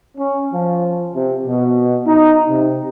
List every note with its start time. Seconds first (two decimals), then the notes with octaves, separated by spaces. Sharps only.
0.18 C#4
0.53 F3
1.14 C3
1.47 B2
2.06 D#4
2.49 C3